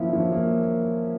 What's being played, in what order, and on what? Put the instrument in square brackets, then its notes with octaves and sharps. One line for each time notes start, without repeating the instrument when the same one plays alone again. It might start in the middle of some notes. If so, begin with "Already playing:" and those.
Already playing: [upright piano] F3 A#3 C#4 E4
F3
A#3